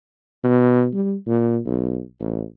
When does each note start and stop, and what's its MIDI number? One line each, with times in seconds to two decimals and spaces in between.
0.44 0.88 47
0.94 1.15 55
1.27 1.59 46
1.66 2.01 35
2.20 2.43 33